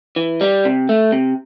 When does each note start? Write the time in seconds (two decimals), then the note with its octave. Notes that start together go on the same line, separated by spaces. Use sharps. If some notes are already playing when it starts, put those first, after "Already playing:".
0.16 E3
0.41 G3
0.65 C3
0.89 A3
1.12 C3